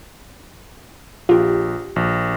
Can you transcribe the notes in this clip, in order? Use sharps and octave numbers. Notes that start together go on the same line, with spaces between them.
A#1 F4 G4
A#1